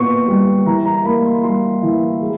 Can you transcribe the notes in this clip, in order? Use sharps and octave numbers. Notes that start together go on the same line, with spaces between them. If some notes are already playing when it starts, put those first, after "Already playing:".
Already playing: A#2 B3 C6 C#6
G3
E3 A#5
A#5
A#5
A#3 B5
C6
G3 C6
E3
G#3